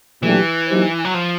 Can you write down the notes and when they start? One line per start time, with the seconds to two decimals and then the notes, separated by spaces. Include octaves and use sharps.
0.22 A#2 E3 F#3 A3 D4 G4
0.68 F#3 A#3 D#4 G4 C5
1.05 F#3
1.14 F3